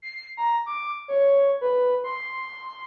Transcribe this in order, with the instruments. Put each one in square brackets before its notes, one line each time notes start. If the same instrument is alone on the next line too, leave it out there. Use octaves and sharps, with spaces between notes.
[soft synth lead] C7
A#5
D6
C#5
B4
C6